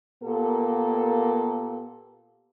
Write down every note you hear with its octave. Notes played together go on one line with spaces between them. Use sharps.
A#2 A#3 B3 G4 A4